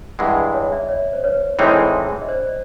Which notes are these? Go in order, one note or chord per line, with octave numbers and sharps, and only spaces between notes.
G2 E3 G#3 F#5 G#5
C#5 D#5
D5 E5
C#5 D#5
C5
B4 C#5
A2 E3 G#3 C4 D#4 B4 C#5
D#5
C5 D5